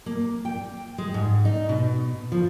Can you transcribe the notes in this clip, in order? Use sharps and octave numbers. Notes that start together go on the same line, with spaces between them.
A#3
G5
G#3
G#2
D#4
B2
F3